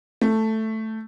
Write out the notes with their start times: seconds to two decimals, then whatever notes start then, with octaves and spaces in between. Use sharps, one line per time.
0.21 A3